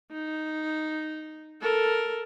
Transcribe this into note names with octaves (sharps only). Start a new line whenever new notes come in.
D#4
A4 A#4